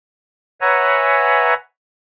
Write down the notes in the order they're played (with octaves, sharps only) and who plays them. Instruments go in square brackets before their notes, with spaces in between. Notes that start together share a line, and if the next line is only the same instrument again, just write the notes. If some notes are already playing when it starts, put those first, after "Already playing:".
[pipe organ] B4 C#5 E5 F#5 G#5 A#5